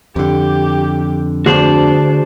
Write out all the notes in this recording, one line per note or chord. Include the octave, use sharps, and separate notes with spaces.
F2 D3 G4
D2 D4 F#4 G#4 C5